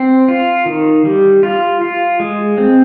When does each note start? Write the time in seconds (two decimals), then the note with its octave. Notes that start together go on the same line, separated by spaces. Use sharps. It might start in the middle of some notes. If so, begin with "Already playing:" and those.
Already playing: C4
0.28 F4
0.66 D#3
1.05 G3
1.43 F4
1.81 F4
2.20 G#3
2.58 C4